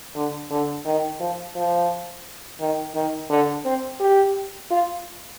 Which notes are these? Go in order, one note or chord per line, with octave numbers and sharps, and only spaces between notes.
D3
D3
D#3
F3
F3
D#3
D#3
D3
C4
G4
F4